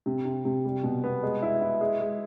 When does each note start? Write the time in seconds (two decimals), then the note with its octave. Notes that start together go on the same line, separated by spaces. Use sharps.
0.06 C3
0.25 C3
0.45 C3
0.65 G3
0.83 B2
1.04 B3
1.23 G#3
1.43 E4
1.61 E4
1.81 G#3
2.00 G#3